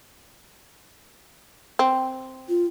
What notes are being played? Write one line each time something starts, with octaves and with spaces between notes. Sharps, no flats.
C4
F4